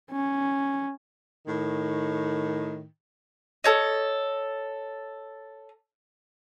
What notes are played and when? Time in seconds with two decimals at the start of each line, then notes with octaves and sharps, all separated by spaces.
0.12 C#4
1.46 A2 D#3
3.64 A4 C#5 D#5